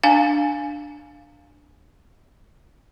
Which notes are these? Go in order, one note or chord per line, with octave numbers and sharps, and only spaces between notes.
D4 F5 G#5